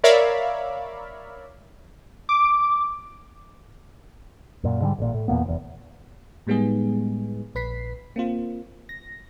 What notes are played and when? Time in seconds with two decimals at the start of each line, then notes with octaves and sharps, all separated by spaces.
0.04 A#4 C#5 D5 E5 F5 B5
2.29 D6
4.63 F#2 A#2
4.81 G#2 D3 D#3 G3
4.99 A1 A#2
5.14 A2
5.28 E2 A#2 A#3 B3
5.44 F1 E2
6.47 A2 G3 G#3 B3 D#4 G#4
7.55 A#1 B4 B6 C7
8.16 A#3 C4 F4
8.89 A#6